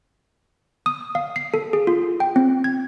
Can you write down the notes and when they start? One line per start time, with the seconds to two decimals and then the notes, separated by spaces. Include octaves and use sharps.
0.86 D#6
1.15 F5
1.36 C7
1.54 A4
1.73 G#4
1.87 F4
2.20 G5
2.36 C4
2.64 G#6